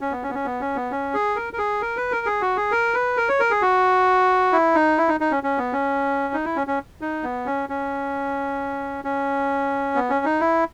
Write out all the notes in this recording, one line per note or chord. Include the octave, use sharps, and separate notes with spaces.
C#4
B3
C#4
B3
C#4
B3
C#4
B3
C#4
G#4
A#4
A#4
G#4
A#4
B4
A#4
G#4
F#4
G#4
A#4
B4
A#4
C#5
A#4
G#4
F#4
E4
D#4
E4
D#4
D#4
C#4
C#4
B3
C#4
D#4
E4
C#4
C#4
D#4
B3
C#4
C#4
C#4
B3
C#4
D#4
E4